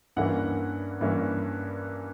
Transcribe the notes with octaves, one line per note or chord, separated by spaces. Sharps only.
G2 E3 A#3 C#4 F#5
G2 E3 A#3 C#4